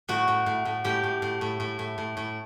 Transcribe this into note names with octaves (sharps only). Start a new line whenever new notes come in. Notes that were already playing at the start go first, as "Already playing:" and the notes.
A2 F#4
A2
A2
A2
A2 G4
A2
A2
A2
A2
A2
A2
A2